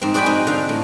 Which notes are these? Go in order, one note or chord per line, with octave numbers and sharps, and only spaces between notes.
G#2 C4
F#4 G#4 D5 G5 G#5 B5
C4 D#4
D3 F5
A2